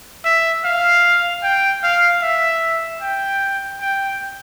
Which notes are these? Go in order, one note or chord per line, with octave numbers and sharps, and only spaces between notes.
E5
F5
G5
F5
E5
G5
G5